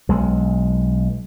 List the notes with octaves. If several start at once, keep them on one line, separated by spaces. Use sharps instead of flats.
B1 G#3